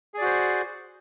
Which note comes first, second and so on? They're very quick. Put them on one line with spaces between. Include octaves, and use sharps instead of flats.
G#4 D5 F#4 C5